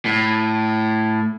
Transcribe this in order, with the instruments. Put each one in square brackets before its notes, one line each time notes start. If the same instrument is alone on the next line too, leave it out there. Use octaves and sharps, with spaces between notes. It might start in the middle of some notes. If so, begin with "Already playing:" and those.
[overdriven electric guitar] A2